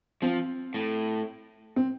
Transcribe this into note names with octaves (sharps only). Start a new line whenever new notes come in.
F3 C4
A2
C4